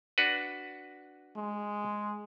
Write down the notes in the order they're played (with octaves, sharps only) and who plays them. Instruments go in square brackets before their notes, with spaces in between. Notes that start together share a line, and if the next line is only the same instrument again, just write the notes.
[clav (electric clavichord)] D4 F#4 B4
[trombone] G#3